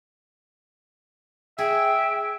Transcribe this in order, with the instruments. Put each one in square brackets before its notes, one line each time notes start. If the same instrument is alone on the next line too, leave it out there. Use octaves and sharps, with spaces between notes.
[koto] G#4 [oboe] E5 [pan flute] G5